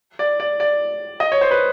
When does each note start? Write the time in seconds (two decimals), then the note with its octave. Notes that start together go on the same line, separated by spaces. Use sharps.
0.19 D5
0.40 D5
0.60 D5
1.20 D#5
1.32 C#5
1.41 C5
1.51 B4